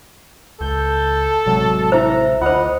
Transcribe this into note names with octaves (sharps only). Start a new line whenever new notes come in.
C#2 A4 G6
A1 C3 F#3 G#3
E4 C5 E5 A#5
D2 F4 C5 D#5 F#5